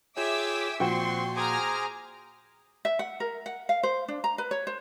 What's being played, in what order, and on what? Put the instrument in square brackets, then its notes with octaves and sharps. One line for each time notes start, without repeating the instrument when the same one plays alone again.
[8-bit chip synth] F4 G#4 C#5 [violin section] E5 D6 E6 [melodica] G5 G#5
[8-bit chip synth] A#2 A#3 [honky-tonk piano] F3 F#4 G5 [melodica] C4 C#6 [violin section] C6
[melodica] G#4 C5 D6 [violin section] G#5 A#5 F6
[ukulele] E5
F#5
A#4
F#5
F5
C5
D4
A#5
B4
C#5
C5